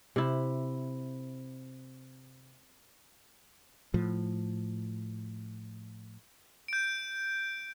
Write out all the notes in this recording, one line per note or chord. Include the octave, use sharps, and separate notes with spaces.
C3 E4
A2 F3
G6 D7